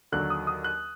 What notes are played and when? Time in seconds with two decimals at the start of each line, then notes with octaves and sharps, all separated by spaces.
0.12 D#2 D3 F#3 F#6
0.30 D#6
0.47 D#6
0.64 F#6